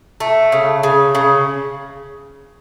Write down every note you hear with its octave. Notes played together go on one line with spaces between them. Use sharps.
A3
C#3
C#3
C#3